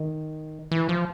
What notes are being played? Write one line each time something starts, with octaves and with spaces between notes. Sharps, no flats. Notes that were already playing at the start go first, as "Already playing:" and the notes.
Already playing: D#3
E3
F3